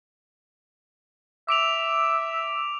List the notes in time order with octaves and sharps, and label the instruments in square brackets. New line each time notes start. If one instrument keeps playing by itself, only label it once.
[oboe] E5 [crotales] D6 D7 F7